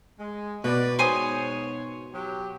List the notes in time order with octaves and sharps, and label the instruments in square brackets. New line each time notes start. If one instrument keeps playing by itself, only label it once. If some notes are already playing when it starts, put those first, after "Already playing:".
[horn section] G#3
[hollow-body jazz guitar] B2 [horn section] B4 D5
[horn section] G#2 C#5 [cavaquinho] C5 G#5 D#6
[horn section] F#3 G4